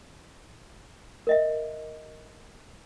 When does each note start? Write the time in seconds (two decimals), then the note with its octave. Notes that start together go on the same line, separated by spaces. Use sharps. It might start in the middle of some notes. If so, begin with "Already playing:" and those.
1.27 A#4 D#5 E5